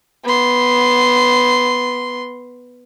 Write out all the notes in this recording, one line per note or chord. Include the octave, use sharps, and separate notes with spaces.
B3 C6